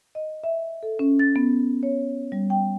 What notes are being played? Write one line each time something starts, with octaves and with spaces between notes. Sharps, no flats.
D#5
E5
A4
C#4
A6
B3
C#5
G3
G5